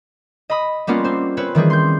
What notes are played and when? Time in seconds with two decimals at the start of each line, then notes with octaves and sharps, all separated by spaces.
0.50 D#5 B5 D#6
0.87 G3 A#3 B3 C#4 F4
1.04 C4 C5
1.37 C4 C#4 B4 C#5
1.55 D#3 E3 G3 G#4
1.70 C6 G6